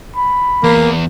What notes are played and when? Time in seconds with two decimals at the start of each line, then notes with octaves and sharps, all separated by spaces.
0.16 B5
0.64 E2 A#3